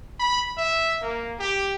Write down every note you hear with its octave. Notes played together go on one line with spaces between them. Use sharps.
B5
E5
A#3
G4